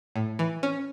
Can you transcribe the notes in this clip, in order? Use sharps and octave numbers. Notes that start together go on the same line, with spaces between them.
A2
E3
C#4